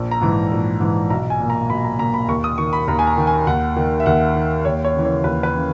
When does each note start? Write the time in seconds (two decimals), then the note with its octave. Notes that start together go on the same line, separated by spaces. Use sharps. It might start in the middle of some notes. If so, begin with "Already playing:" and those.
Already playing: A#1
0.11 A#5
0.21 G#2 E3
0.52 A#1
0.80 G#2 E3
1.10 B1 A#5
1.30 G#5
1.40 A#2
1.50 A#5
1.70 B1 B5
1.84 A#5
1.99 A#2 A#5
2.14 B5
2.28 D#2 C#6
2.44 D#6
2.58 D#3 C#6
2.73 B5
2.87 D#2 A#5
2.99 G#5
3.07 A#5
3.17 D#3
3.27 G#5
3.47 D#2 F#5
3.76 D#3
4.00 E5
4.06 D#2 F#5
4.36 D#3
4.65 D#2 C#5
4.85 C#5
4.94 C#3 E3
5.05 C#5
5.24 D#2 B4
5.43 B4
5.54 C#3 E3